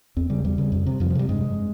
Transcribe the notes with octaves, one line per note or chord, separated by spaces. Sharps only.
E2 C4
C#3 G3
E2 G3
C#3
F2
C3
F2 F3
F3
C3 G3
G2 G#3